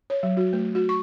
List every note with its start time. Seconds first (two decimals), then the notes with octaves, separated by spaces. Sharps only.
0.10 C#5
0.23 F#3
0.37 F#4
0.53 A3
0.75 F#4
0.89 C#6